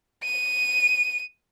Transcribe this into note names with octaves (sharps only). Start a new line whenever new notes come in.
D#7